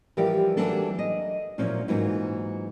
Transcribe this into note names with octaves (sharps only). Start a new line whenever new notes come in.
E3 F3 G3 G4 A#4 D5
E3 F#3 G3 A#3 D4 A4
D#5
A#2 F3 F#3 A#3 C#4 E4
G#2 E3 F#3 A#3 F4 F#4